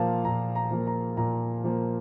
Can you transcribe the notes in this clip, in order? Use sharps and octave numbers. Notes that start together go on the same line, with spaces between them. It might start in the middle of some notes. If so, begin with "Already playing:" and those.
Already playing: A#2 F3 A#3 F5 A5
A#2 A#5
A#5
F3 A#3
A#5
A#2 A#5
F3 A#3